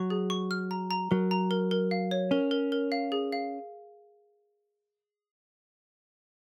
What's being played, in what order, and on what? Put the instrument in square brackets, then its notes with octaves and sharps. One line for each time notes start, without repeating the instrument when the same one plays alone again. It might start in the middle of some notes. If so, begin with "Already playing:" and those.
Already playing: [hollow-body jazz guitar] F#3 [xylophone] C#6
[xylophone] G#4
C#6
F6
A#5
A#5
[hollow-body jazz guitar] F#3 [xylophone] A#4
[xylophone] A#5
A#4
A#4
F5
C#5
[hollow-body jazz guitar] C#4 [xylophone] A#4
[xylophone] A#4
A#4
F5
G#4
F5